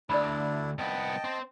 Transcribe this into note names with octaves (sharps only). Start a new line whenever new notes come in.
D2 D4 E4 D5 B5
C2 B3 D#5 G5 A5
C4 C5